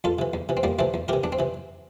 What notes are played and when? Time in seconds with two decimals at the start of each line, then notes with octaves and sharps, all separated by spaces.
0.04 E2 F4 A4
0.19 C3 E3
0.34 E2
0.49 C3 E3
0.57 C4
0.63 E2 G3 A#3
0.79 C3 E3 A3 C4
0.94 E2
1.08 C3 E3 G4 A#4
1.24 E2 D4
1.32 C4
1.39 C3 E3